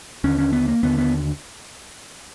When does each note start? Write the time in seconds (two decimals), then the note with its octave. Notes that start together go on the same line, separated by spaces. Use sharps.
0.24 D#2 D3 C#4
0.38 C#4
0.53 B3
0.68 A#3
0.83 D#2 D3 B3
0.98 B3